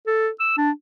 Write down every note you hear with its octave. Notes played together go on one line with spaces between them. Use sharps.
A4
E6
D4